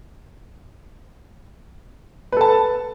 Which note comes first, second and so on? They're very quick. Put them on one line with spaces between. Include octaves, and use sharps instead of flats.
B4 A4 A5